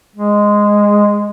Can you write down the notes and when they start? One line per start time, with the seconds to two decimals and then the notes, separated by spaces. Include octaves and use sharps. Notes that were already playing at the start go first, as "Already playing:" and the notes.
0.16 G#3